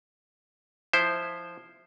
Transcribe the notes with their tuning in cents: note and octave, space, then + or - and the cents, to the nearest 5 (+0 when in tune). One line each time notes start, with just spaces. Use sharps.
F3 +0 E4 +0 C5 +0